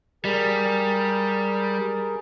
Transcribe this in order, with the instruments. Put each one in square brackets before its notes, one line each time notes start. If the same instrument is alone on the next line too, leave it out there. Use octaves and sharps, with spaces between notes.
[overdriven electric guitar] G3 [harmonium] G#4 A#4